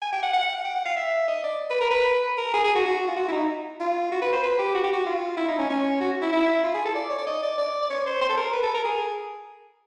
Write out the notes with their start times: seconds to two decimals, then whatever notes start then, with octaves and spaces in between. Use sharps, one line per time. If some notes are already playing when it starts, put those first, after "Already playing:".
0.02 G#5
0.12 G5
0.23 F#5
0.33 F#5
0.64 G5
0.75 F#5
0.85 F5
0.96 E5
1.28 D#5
1.44 D5
1.70 B4
1.80 A#4
1.91 B4
2.38 A#4
2.54 G#4
2.64 G#4
2.75 F#4
2.86 F#4
3.08 F4
3.16 F#4
3.28 E4
3.32 D#4
3.80 F4
4.12 F#4
4.22 B4
4.33 C5
4.43 B4
4.59 G4
4.75 F#4
4.84 G4
4.93 F#4
5.06 F4
5.37 E4
5.48 D#4
5.59 C#4
5.70 C#4
6.01 F#4
6.22 E4
6.33 E4
6.64 F4
6.74 G#4
6.85 A4
6.95 D5
7.10 C#5
7.19 D5
7.27 D#5
7.43 D5
7.58 D5
7.82 D5
7.90 C#5
8.06 C5
8.21 C5
8.29 A4
8.37 A#4
8.53 B4
8.63 A4
8.74 A#4
8.85 G#4